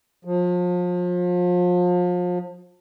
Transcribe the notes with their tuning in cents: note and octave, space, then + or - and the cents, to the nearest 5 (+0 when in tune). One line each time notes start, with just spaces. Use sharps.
F3 +35